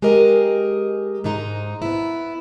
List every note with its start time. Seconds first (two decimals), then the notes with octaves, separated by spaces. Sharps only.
0.02 G#3 G4 G#4 A#4 D#5
1.24 G#2 G#3 D#4 A#5
1.82 B3 E4